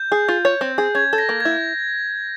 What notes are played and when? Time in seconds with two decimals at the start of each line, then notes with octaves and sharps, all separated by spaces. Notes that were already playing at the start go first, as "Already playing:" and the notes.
Already playing: G6
0.12 G#4
0.28 F4
0.45 C#5
0.61 C4
0.78 G#4
0.95 C#4 G#6
1.13 A4
1.18 A#6
1.29 A#3
1.40 E4 G#6